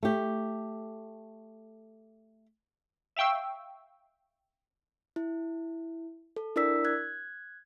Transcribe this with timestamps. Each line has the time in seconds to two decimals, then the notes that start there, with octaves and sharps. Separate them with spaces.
0.03 A3 G4
3.17 E5 F5 G5 C#6 E6
5.16 E4
6.36 A4
6.56 D4 E4 A#4 D5 E6 B6
6.85 F#6 G#6